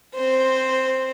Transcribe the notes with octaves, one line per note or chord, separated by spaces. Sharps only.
C4 C5